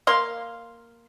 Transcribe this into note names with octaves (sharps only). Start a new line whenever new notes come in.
A#3 F5 C6